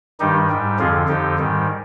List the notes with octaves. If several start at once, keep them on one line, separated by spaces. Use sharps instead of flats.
G2 D#3 G3 D#4 G4
G#2 G3
F2 D3 F3 F4 G#4
F2 D3 F3 D#4 G4
G#2 D#3 G3